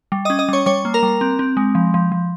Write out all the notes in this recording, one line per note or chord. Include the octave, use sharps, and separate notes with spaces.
G3
D#5 D#6
C#4
D#5 D#6
G3 C#5 C#6
G3 C#5 C#6
A#3
A#4 A#5
G3
C4
C4
G#3
F3
F3
F3